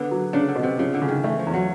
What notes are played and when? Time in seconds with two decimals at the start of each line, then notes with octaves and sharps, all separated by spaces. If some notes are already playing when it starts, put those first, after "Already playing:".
Already playing: D3 B3
0.11 F#3
0.33 C#3 D4
0.48 D3
0.56 B2
0.63 C3
0.78 C#3 F3
0.94 D3
1.02 C#3
1.09 D#3
1.23 E3 A3
1.39 F3
1.47 E2
1.54 F#3